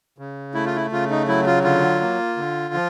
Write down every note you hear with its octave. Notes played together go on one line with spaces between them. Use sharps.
C#3
A3 E4
F4
E4
C#3 F4
D#4
F#3 E4
F4
D3 F4
A#3
D3
F3